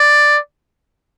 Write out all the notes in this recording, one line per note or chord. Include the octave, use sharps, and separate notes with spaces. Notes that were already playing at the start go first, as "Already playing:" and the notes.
Already playing: D5